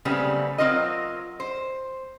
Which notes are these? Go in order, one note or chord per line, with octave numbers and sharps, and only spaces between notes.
C#3 F#3 G3 A3 B3 C4
F#3 G#3 C4 F4 A#4 D#5
C5